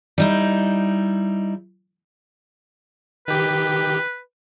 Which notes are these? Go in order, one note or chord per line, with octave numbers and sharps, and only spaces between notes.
G3 D#4 E4
D#3 G4 B4